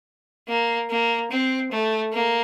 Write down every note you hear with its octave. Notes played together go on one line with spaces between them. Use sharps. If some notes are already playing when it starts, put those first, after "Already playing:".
A#3
A#3
C4
A3
A#3